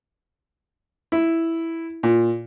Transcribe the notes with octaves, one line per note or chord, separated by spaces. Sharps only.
E4
A#2